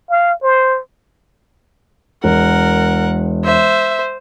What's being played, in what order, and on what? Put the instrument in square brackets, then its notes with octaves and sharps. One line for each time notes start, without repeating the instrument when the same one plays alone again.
[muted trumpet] F5
C5
[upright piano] E1 [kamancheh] A#4 [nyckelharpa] F#5
[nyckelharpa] C5 [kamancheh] E5